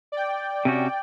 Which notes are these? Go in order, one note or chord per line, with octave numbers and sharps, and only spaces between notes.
D5 G5
C3 C#4 F#4